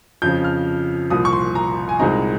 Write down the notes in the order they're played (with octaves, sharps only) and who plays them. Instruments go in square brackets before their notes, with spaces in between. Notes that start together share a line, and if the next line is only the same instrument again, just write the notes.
[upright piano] F2 C#3 F3 G6
F6
C2 A#2 F3 D#6
C#6
C6
A#5
G#5
C2 A#2 G#3 C4 D#4 A#5